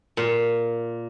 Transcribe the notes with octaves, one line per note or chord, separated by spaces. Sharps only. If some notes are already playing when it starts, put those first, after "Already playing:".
A#2